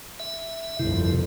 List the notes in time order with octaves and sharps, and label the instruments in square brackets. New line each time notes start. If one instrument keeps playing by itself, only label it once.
[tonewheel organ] E5
[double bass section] G1 C2 F2 [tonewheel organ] C3 E4